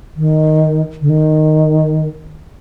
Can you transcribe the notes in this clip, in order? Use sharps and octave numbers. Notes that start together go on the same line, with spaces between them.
D#3
D3
D#3